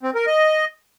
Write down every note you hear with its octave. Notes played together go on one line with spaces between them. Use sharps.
C4
A#4
D#5